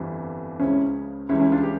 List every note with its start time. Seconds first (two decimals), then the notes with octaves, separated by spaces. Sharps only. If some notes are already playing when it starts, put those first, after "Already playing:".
Already playing: G1 F2 E3 G3
0.60 C#2 C#3 F3 C#4 E4
1.29 C#2 C#3 E3 G3 C#4 E4
1.40 C#4 E4
1.52 D4 F4
1.63 G4